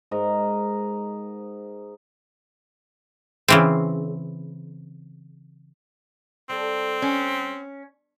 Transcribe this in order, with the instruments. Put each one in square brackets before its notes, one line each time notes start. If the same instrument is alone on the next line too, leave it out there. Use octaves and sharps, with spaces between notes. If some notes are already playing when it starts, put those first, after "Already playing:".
[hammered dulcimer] G#2 A#4 D#5
[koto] C#3 E3 C4
[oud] G3 A4 [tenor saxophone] C4
[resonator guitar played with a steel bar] C#4